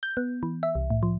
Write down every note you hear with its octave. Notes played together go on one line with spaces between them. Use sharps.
G6
B3
E3
E5
C2
A2
F3